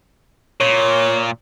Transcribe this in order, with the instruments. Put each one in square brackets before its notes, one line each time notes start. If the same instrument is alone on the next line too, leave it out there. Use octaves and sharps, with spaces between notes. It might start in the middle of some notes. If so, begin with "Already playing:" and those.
[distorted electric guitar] A#2 [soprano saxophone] C#5